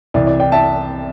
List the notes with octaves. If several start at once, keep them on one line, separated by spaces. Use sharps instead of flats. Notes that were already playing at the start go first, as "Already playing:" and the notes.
C2 C3 E3 D5
D5
D5 G5
E5 A5